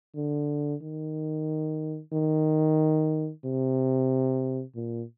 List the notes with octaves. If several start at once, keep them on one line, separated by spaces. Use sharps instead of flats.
D3
D#3
D#3
C3
A#2